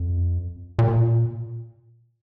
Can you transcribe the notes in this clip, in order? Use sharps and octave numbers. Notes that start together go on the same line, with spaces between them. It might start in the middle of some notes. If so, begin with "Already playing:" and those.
Already playing: F2
A#2